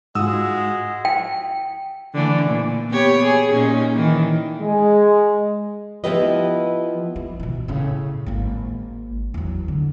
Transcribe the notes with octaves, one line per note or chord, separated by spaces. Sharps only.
G#2 G#3 F4 F#4 D#6 E6
G5
D3 E3 A3
A#2
B3 G4 C#5
G#4
A#2 C#4 D#4
D#3 E3
G#3
F3 B3 E4 G4 B4 D#5
E4
B2 E3
A2 C#3
G#1 A#3
E2 F#3
D3